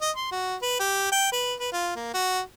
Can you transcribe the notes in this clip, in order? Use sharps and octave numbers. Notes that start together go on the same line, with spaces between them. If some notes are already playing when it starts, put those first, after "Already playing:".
D#5
C6
F#4
B4
G4
G5
B4
B4
F4
A#3
F#4